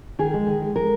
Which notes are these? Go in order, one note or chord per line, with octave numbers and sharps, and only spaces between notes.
D#3 G#4
G#3
D#3
G#3
G#3 A#4